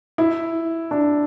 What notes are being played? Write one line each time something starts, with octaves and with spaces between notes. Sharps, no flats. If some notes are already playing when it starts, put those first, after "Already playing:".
E4
D4